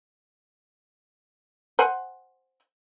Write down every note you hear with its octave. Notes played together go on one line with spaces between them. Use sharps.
C5 F#5 G#5